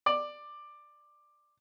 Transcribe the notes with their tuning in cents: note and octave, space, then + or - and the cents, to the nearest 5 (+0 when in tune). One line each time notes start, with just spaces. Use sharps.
D5 +10